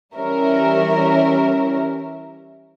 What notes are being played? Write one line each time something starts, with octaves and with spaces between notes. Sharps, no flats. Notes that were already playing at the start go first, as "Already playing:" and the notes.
E3 G3 C#4 A#4 E5